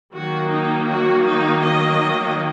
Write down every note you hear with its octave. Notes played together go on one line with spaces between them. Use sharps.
D#3 F#3 A#3 F#4
D#4
F#4
D#4
D#5